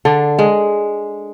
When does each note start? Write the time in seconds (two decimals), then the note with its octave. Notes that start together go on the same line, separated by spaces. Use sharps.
0.05 D3 D4
0.39 G#3